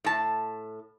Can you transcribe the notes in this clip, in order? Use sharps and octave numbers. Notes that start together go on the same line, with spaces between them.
A2 A5